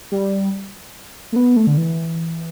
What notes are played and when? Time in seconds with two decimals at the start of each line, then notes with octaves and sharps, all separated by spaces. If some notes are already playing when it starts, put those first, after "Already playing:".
0.12 G3
1.32 A3
1.36 B3
1.56 A3
1.67 D3
1.77 E3